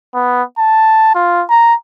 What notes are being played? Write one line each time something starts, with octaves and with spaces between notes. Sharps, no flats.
B3
A5
F4
A#5